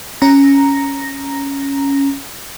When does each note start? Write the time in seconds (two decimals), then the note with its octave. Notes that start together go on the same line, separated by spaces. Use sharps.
0.22 C#4 A#5 A#6